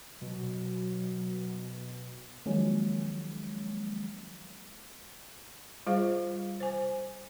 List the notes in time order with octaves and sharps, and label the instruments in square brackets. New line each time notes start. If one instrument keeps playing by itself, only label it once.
[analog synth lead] B2 [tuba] F#3
[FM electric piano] D#3 F3 F#3 G#3 A#3 C#4
[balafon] G3 F4 G#4 C5 F5
C5 G#5